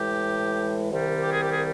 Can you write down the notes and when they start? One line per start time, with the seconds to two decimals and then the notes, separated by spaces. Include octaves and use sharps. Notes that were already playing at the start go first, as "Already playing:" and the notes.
Already playing: A2 E3 G#3 G4
0.90 C2 C3 D#3 G3
1.23 G4
1.32 G#4
1.42 G4
1.52 G#4